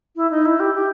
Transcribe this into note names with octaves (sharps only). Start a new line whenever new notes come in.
E4
D#4
E4
G4
G4